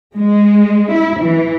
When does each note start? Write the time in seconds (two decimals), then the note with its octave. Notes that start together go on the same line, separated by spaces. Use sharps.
0.16 G#3
0.92 E4
1.23 E3